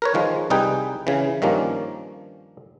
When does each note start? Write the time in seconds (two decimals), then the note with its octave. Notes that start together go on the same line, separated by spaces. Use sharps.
0.02 A#4 B4 C#5
0.14 D#3 F3 G#3
0.50 C2 G3 D#4 G#4 B4 G5
1.07 C#3 E3
1.42 G2 D#3 F3 A#3 C#4